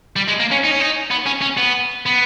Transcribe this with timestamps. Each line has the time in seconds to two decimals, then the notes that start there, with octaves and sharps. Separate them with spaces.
0.16 G3
0.28 G#3
0.40 A#3
0.51 C#4
0.64 D#4
0.71 C#4
0.80 D#4
1.11 B3
1.26 C#4
1.41 C#4
1.57 B3
2.06 B3